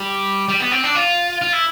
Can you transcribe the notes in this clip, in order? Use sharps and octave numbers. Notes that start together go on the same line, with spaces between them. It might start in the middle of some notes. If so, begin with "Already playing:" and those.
Already playing: G3
G3
B3
C4
D4
F4
F4
E4